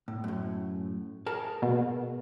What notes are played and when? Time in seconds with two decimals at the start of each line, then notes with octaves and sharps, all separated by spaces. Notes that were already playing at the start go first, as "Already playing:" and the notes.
0.08 A2
0.24 F#2 A2
1.26 G#4 A#4 A5
1.62 B2